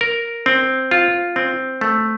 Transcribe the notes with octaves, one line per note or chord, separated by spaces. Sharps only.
A#4
C4
F4
C4
A3